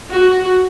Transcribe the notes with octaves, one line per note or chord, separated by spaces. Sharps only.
F#4